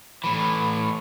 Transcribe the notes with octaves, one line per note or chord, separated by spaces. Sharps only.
A2 E3